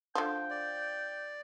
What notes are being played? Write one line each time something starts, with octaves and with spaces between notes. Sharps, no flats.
D3 F3 G5
D5